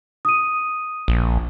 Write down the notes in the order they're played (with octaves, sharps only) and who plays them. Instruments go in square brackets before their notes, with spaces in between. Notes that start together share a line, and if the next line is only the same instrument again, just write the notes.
[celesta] D#6 D#7
[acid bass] A#1